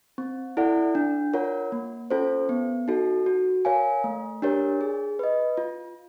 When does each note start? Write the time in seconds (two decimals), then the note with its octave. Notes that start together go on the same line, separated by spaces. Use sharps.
0.18 C4
0.57 E4 A4 D5 F#5
0.95 D4
1.34 F4 A#4 C#5 F#5
1.72 A#3
2.10 C#4 F4 A4 C5
2.49 B3
2.88 D#4 F#4 A4
3.26 F#4
3.65 A#4 C#5 F5 G#5
4.04 A3
4.42 D4 G4 A#4 C#5
4.81 G#4
5.19 B4 D#5
5.57 F4